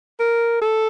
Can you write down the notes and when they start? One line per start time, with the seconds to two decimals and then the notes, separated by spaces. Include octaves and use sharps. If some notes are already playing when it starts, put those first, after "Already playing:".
0.20 A#4
0.61 A4